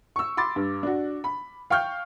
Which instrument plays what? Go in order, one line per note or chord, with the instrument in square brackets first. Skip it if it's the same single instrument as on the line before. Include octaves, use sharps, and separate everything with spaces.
[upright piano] C#6 E6
B5 C6 D6 A6
G2
D4 F#4
B5
F5 G5 C#6 F6 G6